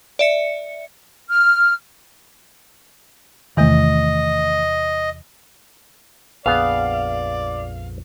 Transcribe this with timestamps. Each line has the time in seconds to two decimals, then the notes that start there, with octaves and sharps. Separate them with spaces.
0.19 D5 E5 C#7
1.30 F6
3.57 E2 C3 D#3 E3 A3 D#5
6.46 A#1 F2 B3 G#4 D5 F5